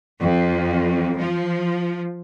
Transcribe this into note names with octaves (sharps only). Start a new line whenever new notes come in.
F2
F3